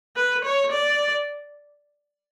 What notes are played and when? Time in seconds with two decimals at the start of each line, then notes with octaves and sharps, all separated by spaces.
0.17 B4
0.45 C#5
0.72 D5